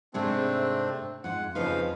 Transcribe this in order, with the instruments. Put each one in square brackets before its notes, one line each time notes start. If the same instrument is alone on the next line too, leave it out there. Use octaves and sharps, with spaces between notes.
[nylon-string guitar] G#2 C3 G#3 [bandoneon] A3 C4 D4
[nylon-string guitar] F2 G#2 [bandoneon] F#5
[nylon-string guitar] F2 D#4 B4 [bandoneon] C#3 F3 F5